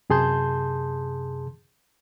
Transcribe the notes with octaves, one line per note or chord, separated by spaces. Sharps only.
F#2 C3 G#4 A5 C6 G6